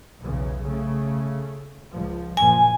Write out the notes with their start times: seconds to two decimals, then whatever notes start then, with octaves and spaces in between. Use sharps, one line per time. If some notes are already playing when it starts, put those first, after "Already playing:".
0.22 B1 E2 C#3
0.64 C#3 A3
1.93 C#2 F3
2.37 F#1 A#2 F3 G#5